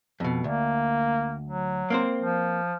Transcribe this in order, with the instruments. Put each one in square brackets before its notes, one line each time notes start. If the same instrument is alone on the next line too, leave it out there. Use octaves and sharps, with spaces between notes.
[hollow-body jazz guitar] F2 B2
[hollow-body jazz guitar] D2 [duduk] A#3
[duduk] F#3
[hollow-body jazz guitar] A#3 C4 C5
[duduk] F3